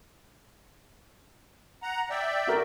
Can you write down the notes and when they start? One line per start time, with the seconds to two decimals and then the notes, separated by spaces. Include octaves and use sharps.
1.83 F#5 A#5
2.10 D5 E5 G5
2.47 F#4 A#4